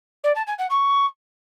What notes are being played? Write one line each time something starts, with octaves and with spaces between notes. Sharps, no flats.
D5
A5
G#5
F#5
C#6